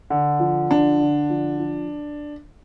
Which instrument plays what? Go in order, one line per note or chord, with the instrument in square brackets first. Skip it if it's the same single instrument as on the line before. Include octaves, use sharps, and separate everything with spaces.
[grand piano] D3
F3
[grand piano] D3 [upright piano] D4
[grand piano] D3
F3
F3